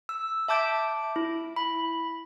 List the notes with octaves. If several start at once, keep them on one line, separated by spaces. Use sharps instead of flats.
E6
E5 A5 D6 G6 D7
E4
B5